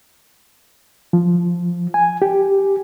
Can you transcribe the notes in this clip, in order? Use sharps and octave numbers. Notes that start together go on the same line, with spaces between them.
F3
G#5
G4